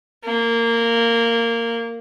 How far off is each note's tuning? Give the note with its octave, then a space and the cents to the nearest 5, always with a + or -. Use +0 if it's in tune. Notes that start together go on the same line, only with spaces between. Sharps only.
A#3 -15